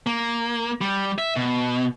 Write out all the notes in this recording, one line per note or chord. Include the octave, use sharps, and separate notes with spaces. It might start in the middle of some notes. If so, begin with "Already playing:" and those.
A#3
G3
E5
B2